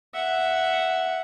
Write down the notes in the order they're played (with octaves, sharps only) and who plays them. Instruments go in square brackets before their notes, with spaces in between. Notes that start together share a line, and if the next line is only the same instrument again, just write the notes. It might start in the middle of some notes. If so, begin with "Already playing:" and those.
[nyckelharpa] E5 F#5